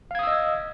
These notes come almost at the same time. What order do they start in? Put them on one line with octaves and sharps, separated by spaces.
F5 G#6 D#6 E6 D#5